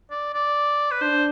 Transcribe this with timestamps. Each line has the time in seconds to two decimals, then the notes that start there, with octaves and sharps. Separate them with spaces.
0.11 D5
0.34 D5
0.91 B4
1.01 D4 C5